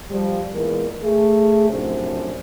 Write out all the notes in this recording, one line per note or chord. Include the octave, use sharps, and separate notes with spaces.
F3 G3
E2 A#2 E3 G#3 A#4
A3 G#4
F#2 A2 C3 F3 D4 C5